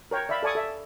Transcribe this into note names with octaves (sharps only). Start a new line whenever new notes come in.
A#4 C#5 G5
D5 E5 F5 B5
A4 D5 G#5 C#6 D#6
A4 E5